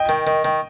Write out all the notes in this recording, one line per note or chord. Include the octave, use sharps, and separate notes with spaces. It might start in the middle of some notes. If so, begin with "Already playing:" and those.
Already playing: D#5 G5
D#3
D#3
D#3